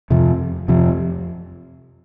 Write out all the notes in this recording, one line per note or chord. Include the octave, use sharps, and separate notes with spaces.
F2 C3 F3
F2 C3 F3